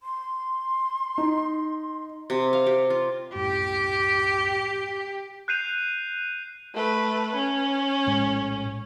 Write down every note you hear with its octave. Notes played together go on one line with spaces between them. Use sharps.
C6
D#4
C3
F5
G4
F4
C2 F#2 A2 G4
F#6 G6 C7 D#7 F7
A3 B4
C#4
A#1 A2 G#3